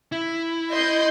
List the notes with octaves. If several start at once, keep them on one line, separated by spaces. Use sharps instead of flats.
E4
D#5 C6 G6